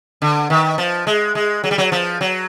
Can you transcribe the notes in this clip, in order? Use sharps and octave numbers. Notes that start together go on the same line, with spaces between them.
D3
D#3
F3
G#3
G#3
F#3
G3
F#3
F3
F#3